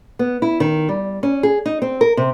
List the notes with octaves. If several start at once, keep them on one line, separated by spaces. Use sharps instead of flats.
B3
E4
D#3
G3
C#4
G#4
D#4
C4
A#4
C3